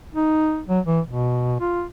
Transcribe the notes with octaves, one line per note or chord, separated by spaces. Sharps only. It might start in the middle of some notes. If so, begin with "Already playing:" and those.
D#4
F#3
E3
B2
F4